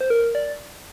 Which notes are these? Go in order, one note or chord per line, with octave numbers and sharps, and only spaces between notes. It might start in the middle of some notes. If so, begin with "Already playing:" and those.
C5
A#4
D5